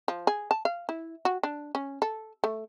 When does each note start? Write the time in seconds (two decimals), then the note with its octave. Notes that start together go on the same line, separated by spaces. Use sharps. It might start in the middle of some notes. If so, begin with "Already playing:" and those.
0.08 F3
0.27 G#4
0.51 A5
0.65 F5
0.89 E4
1.25 F#4
1.43 D4
1.75 C#4
2.02 A4
2.44 A3